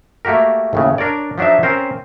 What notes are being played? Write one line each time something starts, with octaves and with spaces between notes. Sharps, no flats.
A3 A#3 F#4 G4 A#4
D#2 A2 C#3
D4 A#4 C#5 D5
F3 F#3 D4 D#4 E5
C4 C#4 A#4 C5